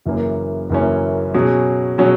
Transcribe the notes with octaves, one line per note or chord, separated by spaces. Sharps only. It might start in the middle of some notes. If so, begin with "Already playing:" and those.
F#1 F#2 E3 A#3 C#4
F#1 F#2 E3 A#3 C#4
B2 F#3 C#4 G#4
B2 F#3 C#4 G#4